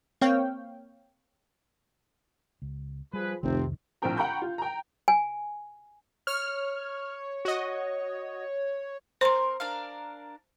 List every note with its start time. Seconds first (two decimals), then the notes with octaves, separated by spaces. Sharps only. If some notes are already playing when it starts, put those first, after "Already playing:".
0.21 A#3 C4 C#5 F5 G5
2.62 C#2
3.13 F3 G3 G#4 B4
3.43 F1 C2 F2 C3 D#3 C4
4.02 A#1 A2 F3 C4 G5 A#5
4.17 F#5 G5 A#5 B5 C#6 G6
4.42 F4
4.58 G5 A#5
5.08 G#5
6.27 C#5 F6
7.45 F#4 D#5
9.21 C4 A#4 C5 C6
9.60 D4 A#4 F5